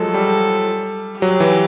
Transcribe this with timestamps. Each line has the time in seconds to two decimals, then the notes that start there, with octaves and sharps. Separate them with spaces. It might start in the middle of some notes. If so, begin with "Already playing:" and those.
Already playing: F3 F#3 G#3 A4
0.14 G3
1.22 F#3 G4
1.40 E3